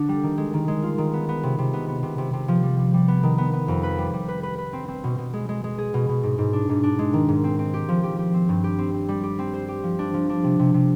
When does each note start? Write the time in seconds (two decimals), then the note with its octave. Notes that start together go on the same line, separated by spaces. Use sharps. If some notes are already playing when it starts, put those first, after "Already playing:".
Already playing: D3 D4
0.09 G3
0.23 D#3
0.38 G#3
0.54 D#3
0.68 G#3
0.83 F4
0.98 D#3
1.13 B3
1.29 B3
1.43 C3
1.58 C3
1.73 B3
1.88 B3
2.03 C3
2.18 C3
2.33 C3
2.48 F3
2.63 G3
2.79 G3
2.94 G3
3.08 B3
3.23 D#3
3.38 B3
3.53 B3
3.68 F2
3.83 B4
3.98 G3
4.13 G3
4.28 B4
4.43 B4
4.58 B4
4.73 C4
4.88 C4
5.04 B2
5.18 B2
5.33 G#3
5.49 G#3
5.64 G#3
5.78 G#4
5.94 B2
6.09 B2
6.23 G#2
6.38 G#2
6.53 D4
6.69 G#2
6.83 D4
6.99 G#3
7.13 D#3
7.29 G#2
7.44 C4
7.59 C4
7.74 G4
7.89 F3
8.03 G4
8.19 G4
8.34 C4
8.49 G2
8.64 G4
8.79 C4
8.93 C4
9.08 G3
9.23 G4
9.39 C4
9.54 C5
9.68 G4
9.83 F3
9.99 D4
10.14 F3
10.29 D4
10.44 C3
10.59 C3
10.74 C3